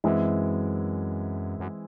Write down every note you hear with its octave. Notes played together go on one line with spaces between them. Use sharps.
F#2 E3 G#3 C4 E4
F#2